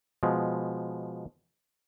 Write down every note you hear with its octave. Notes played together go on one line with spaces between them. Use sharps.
B2 F3 G#3